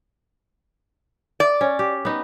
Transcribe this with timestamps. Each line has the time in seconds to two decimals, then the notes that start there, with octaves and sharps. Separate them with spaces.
1.40 D5
1.61 C#4
1.79 G4
2.05 B3 D#4